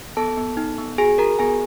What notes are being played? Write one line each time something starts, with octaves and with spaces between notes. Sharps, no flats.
B3 A4 A5
B3
D#4
B3
F#4 G#4 G#5
F#4 A#4 A#5
B3 G#4 G#5